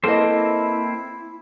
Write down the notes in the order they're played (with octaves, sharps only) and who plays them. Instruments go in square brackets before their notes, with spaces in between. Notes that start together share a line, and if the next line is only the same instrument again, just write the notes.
[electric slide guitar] A#3 C4 C5 [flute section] E4 [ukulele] A4 B4 D#5